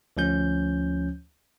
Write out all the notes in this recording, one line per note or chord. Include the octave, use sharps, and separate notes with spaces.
D2 F3 C#4 G6